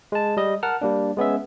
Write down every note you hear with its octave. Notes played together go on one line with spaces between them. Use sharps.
G#3 A5
G3 D#5
A#4 F#5 A5 F6
G3 A#3 D4
G#3 B3 C#4 E5